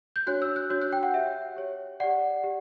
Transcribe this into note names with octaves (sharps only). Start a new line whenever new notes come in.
G6
D4 F#4 C#5 F#6
E6
F#6
D4 F#4 C#5 G6
F#6
G5
F#5
G4 C#5 E5
G4 C#5
G4 D5 F#5
G4